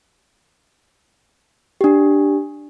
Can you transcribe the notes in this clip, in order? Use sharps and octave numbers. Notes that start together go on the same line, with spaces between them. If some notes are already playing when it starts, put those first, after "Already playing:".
D4 G4